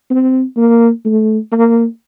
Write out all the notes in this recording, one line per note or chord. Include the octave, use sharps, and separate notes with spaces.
C4
A#3
A3
A#3